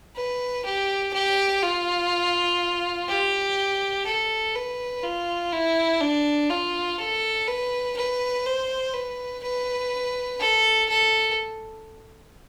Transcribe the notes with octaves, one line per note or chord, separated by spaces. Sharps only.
B4
G4
G4
F4
G4
A4
B4
F4
E4
D4
F4
A4
B4
B4
C5
B4
B4
A4
A4